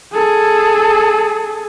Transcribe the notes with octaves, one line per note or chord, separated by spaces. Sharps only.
G#4 A4